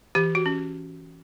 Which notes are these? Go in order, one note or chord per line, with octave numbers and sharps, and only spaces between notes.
E3 G4
F#4
C#4